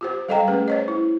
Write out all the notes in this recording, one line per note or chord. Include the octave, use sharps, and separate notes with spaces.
F4 G4 C5
G3 A4 D#5 F5 G5 A#5
A3 C#4 G#4 B4
C5 C#5 D#5
E4